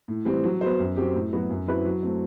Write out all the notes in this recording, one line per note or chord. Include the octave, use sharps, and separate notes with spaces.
A2
E3 G3 C4
F#3
B3 F#4 C5
F#2
F#3 C4 G4
A2
F#3 B3 F#4
F#2
F#3 C4 E4 B4
F#3
A3 C4